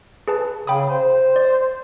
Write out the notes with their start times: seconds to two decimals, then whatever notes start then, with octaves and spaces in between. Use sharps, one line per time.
0.28 G#4 B4 A5
0.67 C#3 G5 B5 D#6
0.90 C5
1.36 D5